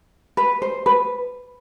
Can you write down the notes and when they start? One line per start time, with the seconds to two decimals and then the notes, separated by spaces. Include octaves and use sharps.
0.37 B4
0.62 C5
0.86 B4